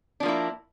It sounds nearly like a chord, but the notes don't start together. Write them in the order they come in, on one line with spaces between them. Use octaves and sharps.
D4 F3 A#3 E4